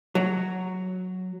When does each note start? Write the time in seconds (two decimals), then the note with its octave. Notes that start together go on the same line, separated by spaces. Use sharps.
0.15 F#3